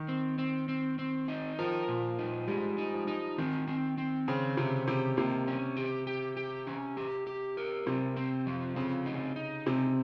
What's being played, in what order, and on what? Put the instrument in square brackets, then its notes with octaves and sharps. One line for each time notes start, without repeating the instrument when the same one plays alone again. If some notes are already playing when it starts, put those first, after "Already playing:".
Already playing: [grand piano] D#3
[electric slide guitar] C4
C4
C4
C4
D#4
[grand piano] F3 [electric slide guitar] A#4
[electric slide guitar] A#2
D#4
[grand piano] G3 [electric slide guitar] G#3
[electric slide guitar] D#4
[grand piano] F3
[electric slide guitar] D#4
[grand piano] D#3 [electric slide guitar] C4
[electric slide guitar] C4
C4
[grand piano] C#3 [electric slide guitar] C5
[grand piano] C3 [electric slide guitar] G4
[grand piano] C3 [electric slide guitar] G4
[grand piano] C3 [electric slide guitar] A#3
[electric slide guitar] C#4
G4
G4
G4
C#4
G4
G4
A#4
[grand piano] C3 [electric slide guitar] C4
[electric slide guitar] C4
F3
[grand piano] C#3 [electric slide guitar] C4
[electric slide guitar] D#4
D#4
[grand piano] C3 [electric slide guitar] C4